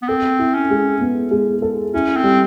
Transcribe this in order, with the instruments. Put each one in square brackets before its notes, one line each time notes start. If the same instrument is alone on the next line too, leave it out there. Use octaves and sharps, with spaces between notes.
[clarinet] B3
[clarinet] C4 [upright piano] A4
[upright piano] E4
[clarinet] C#4
[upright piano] G#3
B3
G#3
A4
[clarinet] C#4 [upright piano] E4
[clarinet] C4
[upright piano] G3